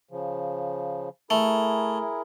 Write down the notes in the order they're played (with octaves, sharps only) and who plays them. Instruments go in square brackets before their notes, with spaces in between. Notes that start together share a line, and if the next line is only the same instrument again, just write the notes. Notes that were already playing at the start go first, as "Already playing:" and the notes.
[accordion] C#3 F3
[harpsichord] A3 [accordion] E4 G#4 A#4